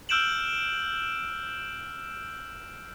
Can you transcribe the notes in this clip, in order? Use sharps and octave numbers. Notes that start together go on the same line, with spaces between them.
E6 F6 G6 D7 E7 F#7